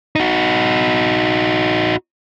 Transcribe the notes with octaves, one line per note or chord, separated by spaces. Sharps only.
D#4 F#4